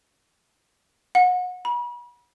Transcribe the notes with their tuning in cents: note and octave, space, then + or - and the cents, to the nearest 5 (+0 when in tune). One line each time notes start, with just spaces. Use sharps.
F#5 -30
B5 -40